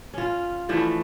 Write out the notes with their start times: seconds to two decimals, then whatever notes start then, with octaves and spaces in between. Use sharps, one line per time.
0.14 C#4 F4
0.69 E3 F3 A3 D4